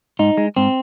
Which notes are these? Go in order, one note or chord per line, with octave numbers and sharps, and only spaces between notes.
G#2 D#4
G#3
G#2 C4